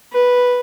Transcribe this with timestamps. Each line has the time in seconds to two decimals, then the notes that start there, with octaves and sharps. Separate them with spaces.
0.13 B4